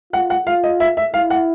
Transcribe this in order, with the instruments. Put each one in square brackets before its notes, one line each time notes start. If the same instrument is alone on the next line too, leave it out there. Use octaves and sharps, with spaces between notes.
[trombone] F4 [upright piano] F#5
[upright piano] F#5
[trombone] F4 [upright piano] F5
[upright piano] D#5
E5
E5
[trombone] E4 [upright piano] F5
[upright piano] F#5